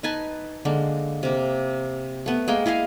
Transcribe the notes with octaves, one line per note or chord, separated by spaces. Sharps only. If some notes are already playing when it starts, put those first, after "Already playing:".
D#4 B4 G#5 A5
D3 G#3 A#3
C3 A#3
A3 B3
G#3 A#3 G#4 G5
E4 G#4 D#5 F5